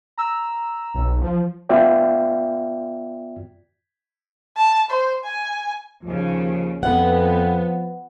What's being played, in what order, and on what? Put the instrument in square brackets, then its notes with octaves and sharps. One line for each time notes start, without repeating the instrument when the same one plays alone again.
[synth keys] A#5 E6
[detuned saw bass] B1
F3
[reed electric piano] B3 F4 F#4 D5 E5 G5
[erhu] A5
C5
G#5
[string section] D#2 C#3 [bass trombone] F3
[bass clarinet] F2 [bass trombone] F3 [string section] B3 [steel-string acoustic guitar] F#5